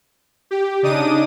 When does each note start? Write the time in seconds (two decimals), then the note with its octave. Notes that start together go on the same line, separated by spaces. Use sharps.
0.51 G4
0.83 C#3 D4 D#4 D6 D#6 D#7